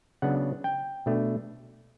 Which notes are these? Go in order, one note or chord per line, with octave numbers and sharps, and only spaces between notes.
C#3 F#3 B3 D4 F#5
G5
B2 A3 D4